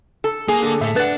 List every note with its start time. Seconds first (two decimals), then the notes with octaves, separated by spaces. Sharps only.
0.24 A4
0.48 A#3 G#4
0.63 D3 A4
0.81 A2 A4 E5
0.96 D4 B4 F#5 A6